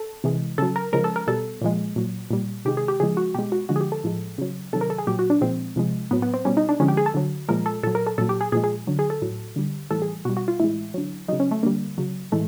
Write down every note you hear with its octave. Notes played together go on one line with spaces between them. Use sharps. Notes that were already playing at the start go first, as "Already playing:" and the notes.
Already playing: A4
C3 E3 G#3
C#3 F#3 A4
A#4
C#3 F3 G#3 A#4
A4
A#4
B2 G3 A4
A#2 F3 G#3
A#2 F#3
A#2 G3
C3 D#3 G#3 G4
G#4
G4
C#3 F3 G#3 G#4
F#4
B2 G#3 G4
F#4
D3 F3 G#3 F#4
G#4
G4
A4
A2 F3 G#3
C#3 F#3
C3 D#3 F#3 A4
A#4
A4
G#4
A#2 F#3 G4
F#4
D4
A#2 F3 G#3 C4
C3 F3 G#3
A2 F#3 B3
B3
C4
B2 G3 C#4
D#4
D4
D3 F3 G#3 C#4
G4
G#4
A4
D3 F#3
A#2 F3 G#3 A#4
A4
A#2 F#3 A4
A#4
A4
A#2 F#3 A4
G4
G#4
A#2 F3 G#3 G#4
G#4
D3 F#3
G#4
A4
A2 F#3
D3 G3
A2 E3 G3 A4
G#4
B2 G3 F#4
F#4
F4
A2 E3 G#3 E4
D3 F#3
C#3 F#3 D#4
C#4
A3
D3 G3 A#3
C#3 F#3
A2 E3 G#3 A3